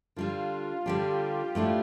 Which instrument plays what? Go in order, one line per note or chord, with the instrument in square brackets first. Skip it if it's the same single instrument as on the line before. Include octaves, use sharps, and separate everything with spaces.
[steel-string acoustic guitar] D3 G3 D4 [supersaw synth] F4
[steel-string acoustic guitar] D3 G3 D4 [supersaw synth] G4
[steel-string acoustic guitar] A2 A3 D4 F4